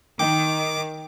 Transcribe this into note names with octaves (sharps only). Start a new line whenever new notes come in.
D#3 G5 D6